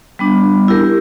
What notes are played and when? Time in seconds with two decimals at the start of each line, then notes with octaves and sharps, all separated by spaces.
0.19 G3 B3 D4
0.68 E4 G4 A#4